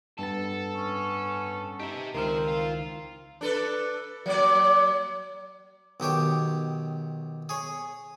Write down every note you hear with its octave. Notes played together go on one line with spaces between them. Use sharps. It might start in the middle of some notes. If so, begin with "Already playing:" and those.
G2 B3 A4 A6
C#4
D#4 G4 E5
C#2 D#3 C4 F4 A#4 C5 F6
F4
D4 A4 B4
F#3 A#3 D5
B1 D#3 G4 C#5
G#4 C#5